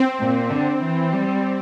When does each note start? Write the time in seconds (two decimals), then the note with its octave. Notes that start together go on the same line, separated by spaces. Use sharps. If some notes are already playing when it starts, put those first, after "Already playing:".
Already playing: C4
0.19 A#2
0.50 D3
0.81 E3
1.12 G3